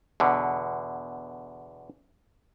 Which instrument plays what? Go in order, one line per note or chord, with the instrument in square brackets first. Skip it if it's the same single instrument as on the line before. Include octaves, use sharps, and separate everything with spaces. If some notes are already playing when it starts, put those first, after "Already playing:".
[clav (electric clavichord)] E2 B2 D3